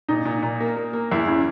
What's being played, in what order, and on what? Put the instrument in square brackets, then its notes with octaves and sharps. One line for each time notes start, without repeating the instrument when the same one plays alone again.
[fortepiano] A#2 [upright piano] D#4
[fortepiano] A#2
A#2
A#3
A#3
A#3
[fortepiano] E2 [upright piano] E4
[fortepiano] C#3 [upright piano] E4